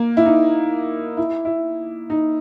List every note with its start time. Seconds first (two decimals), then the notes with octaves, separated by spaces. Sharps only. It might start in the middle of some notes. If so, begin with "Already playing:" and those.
Already playing: A#3
0.17 E4
0.26 D#4
1.17 E4
1.45 E4
2.10 D#4